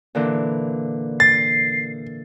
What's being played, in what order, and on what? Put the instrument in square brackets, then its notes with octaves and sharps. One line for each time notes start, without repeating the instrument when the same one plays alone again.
[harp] A#2 D3 E3
[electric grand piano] A6 [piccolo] C7